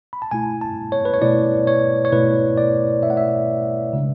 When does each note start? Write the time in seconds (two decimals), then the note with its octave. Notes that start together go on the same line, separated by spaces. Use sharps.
0.13 B5
0.22 A5
0.31 B2 A3 E4 G#5
0.61 A5
0.92 C#5
1.05 B4
1.14 C#5
1.22 B2 A3 E4 D5
1.67 C#5
2.05 C#5
2.12 B2 A3 E4 B4
2.57 D5
3.02 B2 A3 E4 E5
3.10 F#5
3.17 E5
3.93 C#3 G#3 D4